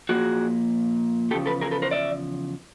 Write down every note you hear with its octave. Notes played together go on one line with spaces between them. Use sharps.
A#2 F3 A#3 F#4 G#4
E2 C#3 F3 G4 A4
A4 B4
G#4 A#4
A4 B4
A#4 C5
D5 E5